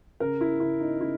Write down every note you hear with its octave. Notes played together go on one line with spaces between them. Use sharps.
C#3 A#4
E4
C#3 E4
D#4
C#3 E4